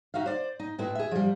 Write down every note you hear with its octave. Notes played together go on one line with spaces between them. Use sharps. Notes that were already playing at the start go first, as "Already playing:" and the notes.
D#4 F#4 E5 F5
C5 D5
D#4
A2 G#3 E4 B4
G#4 E5
F3 G3